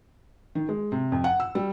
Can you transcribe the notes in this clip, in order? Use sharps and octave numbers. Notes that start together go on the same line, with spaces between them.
D#3
G#3
C3
F2
F#5
E6
G3